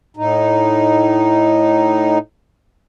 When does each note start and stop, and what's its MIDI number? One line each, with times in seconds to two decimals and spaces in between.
0.17 2.18 45
0.17 2.18 63